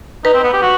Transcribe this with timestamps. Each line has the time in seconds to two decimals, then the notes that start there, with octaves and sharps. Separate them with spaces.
0.24 D#4 B4
0.34 C4
0.43 B3
0.53 G4
0.62 F#4